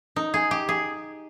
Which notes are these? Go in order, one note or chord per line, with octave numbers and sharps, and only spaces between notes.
D#4
G#4
G4
G#4